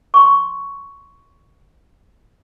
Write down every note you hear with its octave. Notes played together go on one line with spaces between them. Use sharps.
C6 C#6